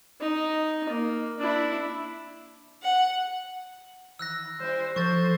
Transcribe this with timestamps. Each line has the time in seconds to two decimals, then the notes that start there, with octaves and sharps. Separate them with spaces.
0.20 D#4
0.89 A#3
1.38 D4 E4
2.82 F#5
4.19 D#3 E6 F#6 A#6
4.59 G3 E4 C5
4.96 F3 A4 C5 C#6 G6 A6